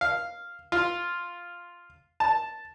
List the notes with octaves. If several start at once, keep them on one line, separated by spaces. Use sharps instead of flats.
F5
F4
A5